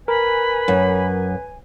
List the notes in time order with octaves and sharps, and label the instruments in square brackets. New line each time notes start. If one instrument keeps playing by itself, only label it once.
[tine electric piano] A#4 [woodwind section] B4 G#5 [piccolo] B5
[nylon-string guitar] F#2